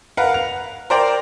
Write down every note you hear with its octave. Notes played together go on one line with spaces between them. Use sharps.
A#4 B4 F5 F#5
F7
A#4 C5 D5 G5